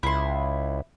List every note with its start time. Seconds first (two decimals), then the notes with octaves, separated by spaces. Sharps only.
0.03 C#2 E4 C6